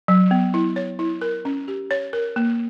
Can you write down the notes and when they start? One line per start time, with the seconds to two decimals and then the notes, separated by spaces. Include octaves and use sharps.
0.08 F#3
0.31 B3
0.54 E4
0.76 C#5
0.99 E4
1.22 A#4
1.45 C#4
1.68 G4
1.91 C#5
2.13 A#4
2.36 A#3